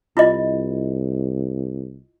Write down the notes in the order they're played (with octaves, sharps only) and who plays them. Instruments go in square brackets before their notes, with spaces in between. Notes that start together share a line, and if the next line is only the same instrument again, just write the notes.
[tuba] C2 [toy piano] E4 F4 D#5